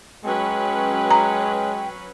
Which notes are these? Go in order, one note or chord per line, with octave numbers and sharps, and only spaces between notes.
F#3 G#3 C#4 B4 G5
A#5